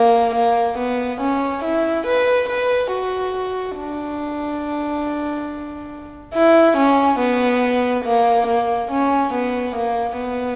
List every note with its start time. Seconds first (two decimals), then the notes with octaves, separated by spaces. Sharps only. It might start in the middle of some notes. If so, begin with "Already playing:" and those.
Already playing: A#3
0.35 A#3
0.78 B3
1.21 C#4
1.64 E4
2.07 B4
2.49 B4
2.92 F#4
3.78 D4
6.34 E4
6.77 C#4
7.20 B3
8.05 A#3
8.47 A#3
8.91 C#4
9.34 B3
9.76 A#3
10.18 B3